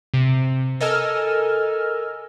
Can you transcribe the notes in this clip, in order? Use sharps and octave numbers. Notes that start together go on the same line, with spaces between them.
C3
A4 A#4 D#5 G#5 E6 F6